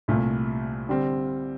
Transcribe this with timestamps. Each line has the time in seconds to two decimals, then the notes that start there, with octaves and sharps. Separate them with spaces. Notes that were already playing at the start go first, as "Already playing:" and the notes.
0.08 C2 A#2 A3
0.89 D3 G3 C4